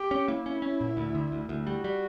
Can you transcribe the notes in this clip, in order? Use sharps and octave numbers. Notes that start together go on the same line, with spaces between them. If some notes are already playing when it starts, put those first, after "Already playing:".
Already playing: G4
C#4
A#3 E4
C#4
C#4
A#2
D2
D3
D2
D2
G3 F#4
G3